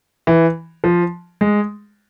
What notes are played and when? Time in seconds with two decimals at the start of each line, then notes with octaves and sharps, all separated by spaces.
0.27 E3
0.84 F3
1.41 G#3